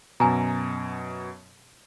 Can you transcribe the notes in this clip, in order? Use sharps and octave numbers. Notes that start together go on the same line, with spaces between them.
F#2 B2 G#5 A#5